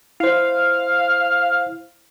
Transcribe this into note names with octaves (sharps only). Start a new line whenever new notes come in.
E4 C5 F5